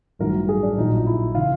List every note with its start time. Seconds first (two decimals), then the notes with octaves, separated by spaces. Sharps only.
0.19 A1 G2 D#3 F#3 A#4
0.49 G#4
0.63 D4
0.77 A#1 A#2 F#3 D#4
1.06 E4
1.35 C#3 E3 F4